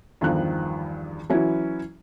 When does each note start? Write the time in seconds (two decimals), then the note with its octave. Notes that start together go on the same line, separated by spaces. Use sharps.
0.21 E2 G2 D#3 F3 F#6
1.29 E3 F#3 C#4 E4 F#4